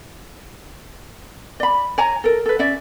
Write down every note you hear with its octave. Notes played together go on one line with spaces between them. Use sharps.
D5 B5
C#5 G#5 A#5
A4 A#4
A4 B4
C#4 D5 E5